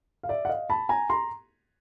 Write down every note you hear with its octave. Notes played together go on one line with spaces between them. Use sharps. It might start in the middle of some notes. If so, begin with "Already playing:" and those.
F5
D5 E5
F#5
D#5 F5
A5 B5
G#5 A#5
A#5 C6